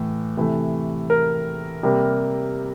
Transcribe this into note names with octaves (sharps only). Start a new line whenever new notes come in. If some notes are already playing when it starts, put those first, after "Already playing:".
Already playing: A2 E3
C3 E3 A3
A#4
C3 G3 A#3